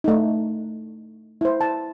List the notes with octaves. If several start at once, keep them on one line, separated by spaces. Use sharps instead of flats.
A3 D#4
E4 C5
A5